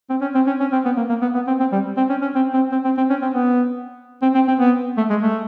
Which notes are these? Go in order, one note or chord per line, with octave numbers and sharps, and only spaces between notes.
C4
C#4
C4
C#4
C#4
C4
B3
A#3
A#3
B3
B3
C4
C4
G3
C4
C#4
C#4
C4
C4
C4
C4
C4
C#4
C4
B3
C4
C4
C4
B3
A3
G#3
A3